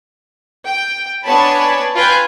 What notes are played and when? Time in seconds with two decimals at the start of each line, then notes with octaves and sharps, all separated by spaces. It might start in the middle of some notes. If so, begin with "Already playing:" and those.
0.67 G5
1.24 B3 D4 C#5 G#5 A5 B5
1.95 F4 B4 G5 G#5 F#6 G6